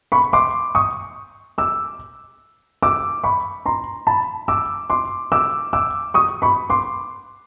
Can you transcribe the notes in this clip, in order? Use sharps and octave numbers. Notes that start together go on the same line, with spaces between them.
B5 C#6
C6 D6
C#6 D#6
D6 E6
D6 E6
B5 C#6
A#5 C6
A5 B5
D6 E6
C6 D6
D6 E6
D6 E6
C#6 D#6
B5 C#6
C6 D6